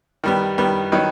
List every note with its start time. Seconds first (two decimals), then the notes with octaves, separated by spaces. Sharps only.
0.24 D#3 G3 B3
0.58 D#3 G3 B3
0.92 D#3 F#3 B3 D#4